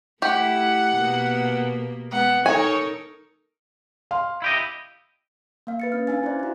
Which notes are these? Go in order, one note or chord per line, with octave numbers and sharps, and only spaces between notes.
A3 E4 G4 F#5
B2 A#3 B3
G#3 B3 F#5
D#4 A4 A#4 C#5 G#5
F5 C6
E4 G4 D#5
A#3 F5
B4 A6 C#7
C#4 F6
D4 F5 G#5 A6
E4 C5 D5
E4 F#4